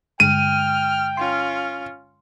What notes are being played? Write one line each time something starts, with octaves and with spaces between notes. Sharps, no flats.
G2 D3 G#3 G5 F6 D#7
C#4 F4 C6